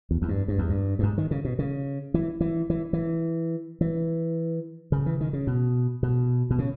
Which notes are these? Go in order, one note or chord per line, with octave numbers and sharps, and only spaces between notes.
E2
E2
G2
G2
E2
G2
G2
G#2
D#3
C#3
B2
C#3
E3
E3
E3
E3
E3
C#3
E3
D#3
C#3
B2
B2
B2
C#3